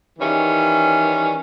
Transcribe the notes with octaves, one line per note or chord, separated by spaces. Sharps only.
D#3 E3 G3 C#4